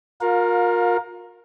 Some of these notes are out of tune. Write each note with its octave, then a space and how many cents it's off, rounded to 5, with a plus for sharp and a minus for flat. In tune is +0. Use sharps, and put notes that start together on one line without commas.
F4 +40 A#4 +0 F5 +30